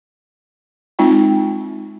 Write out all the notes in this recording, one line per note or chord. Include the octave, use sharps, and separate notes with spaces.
G#3 C4 D#4 F4 G5